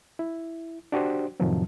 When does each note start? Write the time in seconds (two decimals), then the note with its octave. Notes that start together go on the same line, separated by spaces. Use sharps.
0.19 E4
0.92 D4 F#4 G4 C5
1.40 F2 A2 C3 D#3 F3 F#3